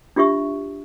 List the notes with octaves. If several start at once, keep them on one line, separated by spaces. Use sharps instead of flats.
D4 F4 G4 E5 C#6